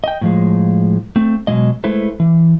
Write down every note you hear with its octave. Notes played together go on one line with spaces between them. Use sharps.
D#5 G5
A2 F3 G#3
A3 C4
B2 D#3 F#3 G#3 D#5
G#3 A3 E4 B4 C5
E3